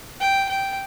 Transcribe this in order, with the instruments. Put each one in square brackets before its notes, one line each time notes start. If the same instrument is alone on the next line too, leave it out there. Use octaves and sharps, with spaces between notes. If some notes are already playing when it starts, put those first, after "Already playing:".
[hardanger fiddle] G5
G5